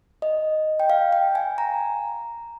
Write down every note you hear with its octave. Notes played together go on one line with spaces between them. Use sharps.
D#5
G5
F5
G5
G#5
A#5